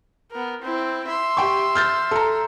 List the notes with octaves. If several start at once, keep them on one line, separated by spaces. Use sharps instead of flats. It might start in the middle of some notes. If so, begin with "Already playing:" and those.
B3 A#4
C4 E4
E5 C6
G4 G5 C#6
F6 G6 A6
A4 A#5